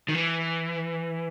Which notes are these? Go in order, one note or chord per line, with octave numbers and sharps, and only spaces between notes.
D#3
E3